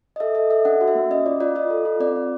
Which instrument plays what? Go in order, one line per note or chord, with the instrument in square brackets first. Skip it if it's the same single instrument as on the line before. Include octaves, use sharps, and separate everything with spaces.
[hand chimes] D#5
A4 E5
A4 D#5
A4 E5
D4 F#5
F#4
E5
A#3
C#4 D#5
F4 D5
F4 D5
F4 D#5
A4
F4
C4 D5
C4